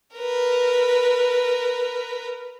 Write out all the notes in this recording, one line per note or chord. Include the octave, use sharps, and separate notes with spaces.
A#4 B4